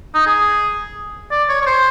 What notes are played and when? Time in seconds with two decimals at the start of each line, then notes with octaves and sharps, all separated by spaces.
0.14 D#4
0.26 G#4
1.31 D5
1.49 C#5
1.61 C#5
1.66 C5